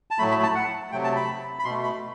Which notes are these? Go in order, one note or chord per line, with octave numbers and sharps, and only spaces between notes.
A5
A2 F#3 A3 B5
B5
A5
F#5
C3 F#3 A3 G5
A5
B5
B5
B2 A3 C6
B5